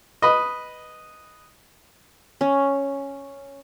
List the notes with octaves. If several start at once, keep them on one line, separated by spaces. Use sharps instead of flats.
B4 D#5
C#4